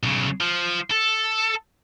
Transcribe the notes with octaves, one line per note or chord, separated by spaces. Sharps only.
B1 C#3
F3
A4